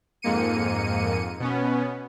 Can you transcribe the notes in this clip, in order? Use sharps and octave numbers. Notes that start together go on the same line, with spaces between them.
F2 G#2 A#3 C#7 D#7
B2 B3 C#4